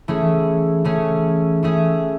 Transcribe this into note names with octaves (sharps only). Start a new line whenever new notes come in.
E3 A3 C#4 G#4
E3 A3 C#4 G#4
E3 A3 C#4 G#4